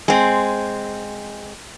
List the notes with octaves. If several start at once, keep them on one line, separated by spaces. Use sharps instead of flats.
G#3 C4